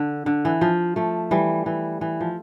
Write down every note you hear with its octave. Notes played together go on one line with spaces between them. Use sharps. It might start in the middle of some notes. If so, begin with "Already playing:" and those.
Already playing: D3
D3
E3
F3
F3 A3
E3 G3
E3
E3
F3